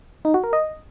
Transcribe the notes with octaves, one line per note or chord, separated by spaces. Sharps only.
D#4
F#4
A#4
D#5